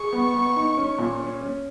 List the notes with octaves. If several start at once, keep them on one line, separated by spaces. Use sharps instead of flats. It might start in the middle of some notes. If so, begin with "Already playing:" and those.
Already playing: G#4 C#6
B3
B3
D#4
C#4
A#2
C#4
C#4